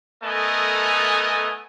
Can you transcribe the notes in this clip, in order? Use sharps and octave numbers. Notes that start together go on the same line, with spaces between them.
A3 B3 A4 A#4 D#5 G#5